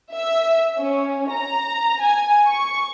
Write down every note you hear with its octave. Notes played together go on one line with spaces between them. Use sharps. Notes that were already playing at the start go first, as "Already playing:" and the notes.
E5
C#4
A#5
G#5
C#6